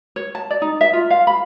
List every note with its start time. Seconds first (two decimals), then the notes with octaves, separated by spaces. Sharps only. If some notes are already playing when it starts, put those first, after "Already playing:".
0.16 C#5
0.35 A5
0.50 D5
0.62 D#4
0.81 E5
0.93 F4
1.10 F5
1.27 B5